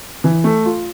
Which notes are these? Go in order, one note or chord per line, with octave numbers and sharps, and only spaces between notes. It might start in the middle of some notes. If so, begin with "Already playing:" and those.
E3
A3
F4